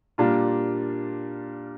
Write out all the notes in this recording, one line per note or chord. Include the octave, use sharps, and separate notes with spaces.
A#2 G3 A#3 D4 F4